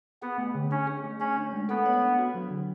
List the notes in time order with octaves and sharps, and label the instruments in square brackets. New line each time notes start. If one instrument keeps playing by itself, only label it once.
[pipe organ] B3 [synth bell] G#4
[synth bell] A3
D3
[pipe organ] C#4 [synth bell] D4
[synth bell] G#4
A3
[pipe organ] C#4 [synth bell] C#5
[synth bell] D4
G#3
[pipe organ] B3 [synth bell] A4
[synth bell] C#5
D4
F#4
F#3
D3